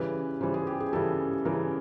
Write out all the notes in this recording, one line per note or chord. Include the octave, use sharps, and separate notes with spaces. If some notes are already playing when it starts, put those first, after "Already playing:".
Already playing: C#3 E3 G3 B4
C#3 E3 G3 C5
G#4
G4
G#4
C#3 E3 G3 A4
C#3 E3 G3 A#4